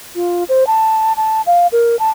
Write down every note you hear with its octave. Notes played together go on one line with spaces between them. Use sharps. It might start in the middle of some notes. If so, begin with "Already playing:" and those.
F4
C5
A5
A5
F5
A#4
A5